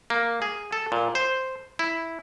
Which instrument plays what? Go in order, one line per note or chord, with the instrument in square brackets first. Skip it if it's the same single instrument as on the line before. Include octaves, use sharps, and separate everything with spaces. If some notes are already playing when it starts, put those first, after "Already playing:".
[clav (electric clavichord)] A#3
G#4
A4
A#2
C5
E4